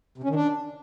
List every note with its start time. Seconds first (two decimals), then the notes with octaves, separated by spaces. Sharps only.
0.18 C3
0.24 C#4
0.29 D#3
0.35 D4